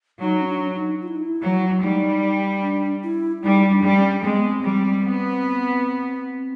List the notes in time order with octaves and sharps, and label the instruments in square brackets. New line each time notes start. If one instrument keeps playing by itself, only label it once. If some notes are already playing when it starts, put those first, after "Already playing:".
[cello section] F#3 [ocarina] D#4
[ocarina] C#4
D4
D#4
F4
E4
D#4
E4
[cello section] F#3
[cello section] G3 [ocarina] D#4
[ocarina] D4
E4
[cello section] G3 [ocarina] D#4
[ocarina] D4
[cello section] G3
[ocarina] C#4
[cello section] G#3 [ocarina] C4
[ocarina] B3
C4
[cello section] G3
B3